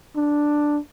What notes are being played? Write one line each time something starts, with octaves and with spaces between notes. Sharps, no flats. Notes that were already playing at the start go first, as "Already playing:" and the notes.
D4